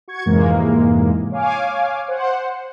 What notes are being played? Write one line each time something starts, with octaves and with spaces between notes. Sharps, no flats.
F#4 C#6 G#6
F2 G#2 C3 E3 G#3 A#3
C#5 F5 G#5 D6
C5 F#5